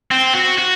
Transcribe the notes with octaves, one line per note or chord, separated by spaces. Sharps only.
C4
F#4
F#4